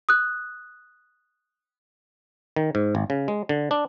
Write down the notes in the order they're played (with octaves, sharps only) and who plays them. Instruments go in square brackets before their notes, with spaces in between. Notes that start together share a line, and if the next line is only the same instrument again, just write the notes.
[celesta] D#6 F#6
[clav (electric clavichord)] D#3
G#2
G#1
C#3
G#3
D3
D4